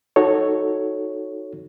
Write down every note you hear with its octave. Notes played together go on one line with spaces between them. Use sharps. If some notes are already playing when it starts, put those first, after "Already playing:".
D#4 F#4 A4 C#5